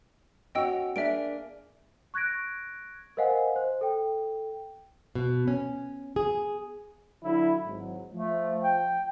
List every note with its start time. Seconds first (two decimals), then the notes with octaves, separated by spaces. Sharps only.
0.55 C#4 F#4 C#5 D#5 G5 E6
0.96 A#3 D4 G#4 E5 D7
2.14 C#6 F#6 G#6 A#6 D7
3.17 A#4 C5 D#5 F5 F#5 G#5
3.56 C5
3.81 A4 G5
5.15 B2
5.48 C#4
6.16 G#4
7.23 D3 F#3 E4
7.65 G#1 G#2 F#3
8.13 F3 A3
8.63 G5